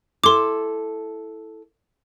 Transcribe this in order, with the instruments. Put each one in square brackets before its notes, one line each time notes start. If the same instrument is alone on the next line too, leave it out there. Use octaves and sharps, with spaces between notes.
[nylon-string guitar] E4 A4 [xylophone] C6 D6